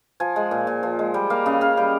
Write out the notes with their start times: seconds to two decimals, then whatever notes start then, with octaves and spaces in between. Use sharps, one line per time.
0.20 F3 G#5
0.36 G#3
0.51 A#2
0.67 A#2
0.83 F3
0.99 G#3
1.14 G3 G5
1.30 A#3 F5
1.46 C#3 D#5
1.61 C#3 F5
1.77 G3 G5